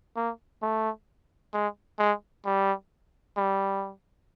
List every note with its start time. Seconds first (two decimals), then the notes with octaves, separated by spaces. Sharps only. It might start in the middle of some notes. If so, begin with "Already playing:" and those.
0.16 A#3
0.62 A3
1.54 G#3
1.98 G#3
2.45 G3
3.37 G3